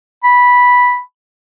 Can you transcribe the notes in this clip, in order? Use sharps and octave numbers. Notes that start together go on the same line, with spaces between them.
B5